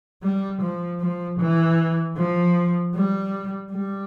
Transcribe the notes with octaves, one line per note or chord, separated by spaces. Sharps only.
G3
F3
F3
E3
F3
G3
G3